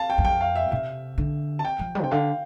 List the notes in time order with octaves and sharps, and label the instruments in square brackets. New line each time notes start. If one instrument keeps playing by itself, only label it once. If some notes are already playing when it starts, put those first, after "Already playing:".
Already playing: [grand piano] F5 A5
G5
[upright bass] E2
[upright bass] F2 [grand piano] G5
[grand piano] F5
E5
[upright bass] C3 [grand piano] E5
[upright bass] D3
[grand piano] A5
G5
[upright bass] F3
G3
[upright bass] C3 [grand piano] G5
[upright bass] D3 [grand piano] F5